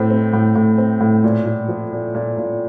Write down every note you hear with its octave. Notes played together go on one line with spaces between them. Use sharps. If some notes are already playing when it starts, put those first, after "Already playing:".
Already playing: A2 C4
C4
A2
A2
C4
A2
A#2
A#2
F3
A#2
A#2
A#2